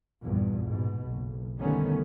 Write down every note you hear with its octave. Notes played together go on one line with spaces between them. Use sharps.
A#1 E2 G2
G#2 B2
F#1 B1
D3 D#3 G3 A3 B3 C#4